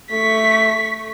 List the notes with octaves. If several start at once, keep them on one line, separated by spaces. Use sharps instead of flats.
A3 C#6 B6